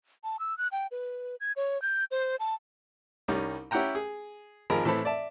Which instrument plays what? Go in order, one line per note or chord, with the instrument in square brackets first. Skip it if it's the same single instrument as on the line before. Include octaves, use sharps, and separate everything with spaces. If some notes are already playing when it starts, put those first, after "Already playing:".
[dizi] A5
E6
F#6
G5
B4
G#6
C#5
G6
C5
A5
[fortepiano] C2 G3 C#4 D#4
C#4 E4 G4 F#5 G5 A#5
G#4
G#1 F3 G#4 A#4 A#5 B5
A2 E3 C4 A4 B5
D5 E5 A5